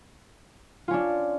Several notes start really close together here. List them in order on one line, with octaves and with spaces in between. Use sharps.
F4 C#4 D4